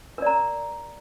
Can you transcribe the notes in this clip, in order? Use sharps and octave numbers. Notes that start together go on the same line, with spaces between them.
A#4 D5 A#5